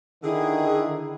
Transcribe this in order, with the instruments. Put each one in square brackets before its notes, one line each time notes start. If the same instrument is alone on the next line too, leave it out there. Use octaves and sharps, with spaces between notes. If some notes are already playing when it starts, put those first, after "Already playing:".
[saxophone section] D3 G#4 [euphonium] D#3 [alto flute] E4